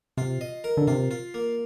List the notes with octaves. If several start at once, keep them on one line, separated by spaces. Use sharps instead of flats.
C3 F4
D#5
A#4
D3
C3 F4
F4
A#3